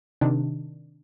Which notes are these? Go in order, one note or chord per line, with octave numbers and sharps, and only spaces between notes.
C3 D#3 D4